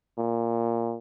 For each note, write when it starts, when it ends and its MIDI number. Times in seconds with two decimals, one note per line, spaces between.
0.18 0.97 46